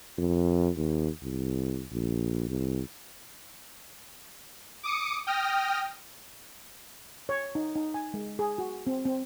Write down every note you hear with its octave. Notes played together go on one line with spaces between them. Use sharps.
F2
D#2
C2
A#1
C2
D6 D#6 C#7
G5 D#6 F6 A#6
C#5
D#4
D#4
G#5
G#3
G#4
F#4
C4
C4